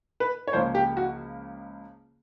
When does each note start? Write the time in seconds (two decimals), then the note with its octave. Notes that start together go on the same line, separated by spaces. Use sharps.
0.20 B4
0.48 C#5
0.53 C#2 C#3 F3 A#3 C5
0.75 G4
0.97 F#4